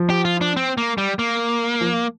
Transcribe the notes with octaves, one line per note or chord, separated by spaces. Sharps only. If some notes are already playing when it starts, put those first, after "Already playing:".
Already playing: F3
G4
F4
D4
C4
A#3
G3
A#3
F3